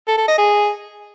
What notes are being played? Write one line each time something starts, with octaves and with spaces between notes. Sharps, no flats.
A4
A4
D#5
G#4